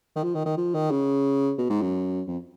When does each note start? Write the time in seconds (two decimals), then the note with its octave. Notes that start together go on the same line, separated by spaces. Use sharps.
0.16 D#3
0.23 F3
0.35 D#3
0.46 D#3
0.57 F3
0.75 D#3
0.91 C#3
1.58 B2
1.70 G#2
1.81 F#2
2.27 F2